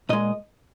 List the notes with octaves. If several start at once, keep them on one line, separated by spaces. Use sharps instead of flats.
A#2 G#3 D#5